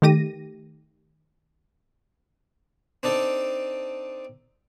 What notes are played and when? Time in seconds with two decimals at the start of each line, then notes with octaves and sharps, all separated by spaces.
0.02 D#3 A3 G4 A#6 D#7
3.03 C4 D4 D#4 A4